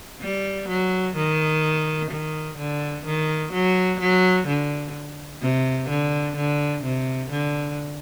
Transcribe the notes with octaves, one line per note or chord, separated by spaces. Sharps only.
G3
F#3
D#3
D#3
D3
D#3
F#3
F#3
D3
C3
D3
D3
C3
D3